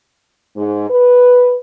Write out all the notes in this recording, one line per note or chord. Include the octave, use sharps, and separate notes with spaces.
G#2
B4